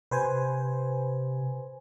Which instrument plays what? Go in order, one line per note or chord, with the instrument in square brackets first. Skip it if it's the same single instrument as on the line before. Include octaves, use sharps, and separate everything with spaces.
[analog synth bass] C3 [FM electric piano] B4 C5 G#5